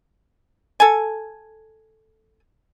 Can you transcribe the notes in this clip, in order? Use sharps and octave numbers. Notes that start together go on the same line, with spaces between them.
A4 G#5